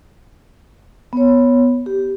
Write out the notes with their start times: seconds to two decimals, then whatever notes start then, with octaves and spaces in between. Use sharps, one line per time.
1.13 B3 C#5
1.86 G4